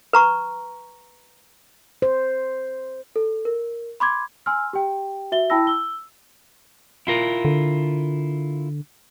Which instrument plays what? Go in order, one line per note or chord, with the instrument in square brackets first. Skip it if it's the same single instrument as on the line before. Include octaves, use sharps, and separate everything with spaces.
[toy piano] B4 A#5 C#6
[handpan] C5
[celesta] A4
A#4
B5 C6 D6 G#6
G#5 C6 E6 F6
G4 G5
F#4 E5 G7
E4 G5 A5 B5 E6 A#6
E6 G7
[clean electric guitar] E4 F4 A#4
[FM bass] D3